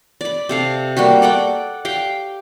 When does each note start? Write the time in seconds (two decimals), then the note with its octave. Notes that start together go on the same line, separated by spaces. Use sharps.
0.21 D5 B5
0.49 C3 A4 F5
0.97 G3 A#3 F#4 G4
1.22 A4 D5 F#5 G5
1.85 G4 F5 G5